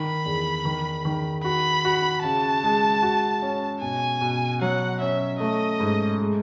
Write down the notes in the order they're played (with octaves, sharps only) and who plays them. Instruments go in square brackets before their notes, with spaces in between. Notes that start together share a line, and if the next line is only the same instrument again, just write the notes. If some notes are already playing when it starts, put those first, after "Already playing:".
Already playing: [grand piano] D#3 [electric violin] B5
[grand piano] E2
D#3
D#3
[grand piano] F#4 [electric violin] B5
[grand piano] F#4
[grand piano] C#3 [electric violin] A5
[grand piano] G#3
F#4
C#4
[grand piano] B2 [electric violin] G#5
[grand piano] B2
[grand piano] F#3 [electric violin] F#5
[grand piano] C#4 [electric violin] E5
[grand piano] A3 [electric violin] D#5
[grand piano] G#2
G#3